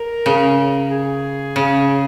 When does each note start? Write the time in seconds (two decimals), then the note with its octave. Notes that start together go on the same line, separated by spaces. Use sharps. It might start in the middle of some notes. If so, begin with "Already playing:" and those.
Already playing: A#4
0.26 C#3
0.91 G#4
1.56 C#3